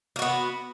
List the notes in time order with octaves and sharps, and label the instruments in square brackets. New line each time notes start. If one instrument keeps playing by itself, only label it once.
[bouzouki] A#3
F#4
B3